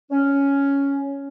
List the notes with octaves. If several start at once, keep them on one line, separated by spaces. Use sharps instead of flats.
C#4